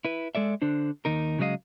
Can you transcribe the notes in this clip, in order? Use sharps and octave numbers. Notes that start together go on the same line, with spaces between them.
E4 B4
G#3 A4 D5 E5
D3 D4 C5
D#2 D#3 D#4 A#4
C#3 F#3 G#3 C4 D#5 F5